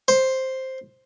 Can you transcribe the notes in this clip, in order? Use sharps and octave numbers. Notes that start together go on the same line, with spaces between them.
C5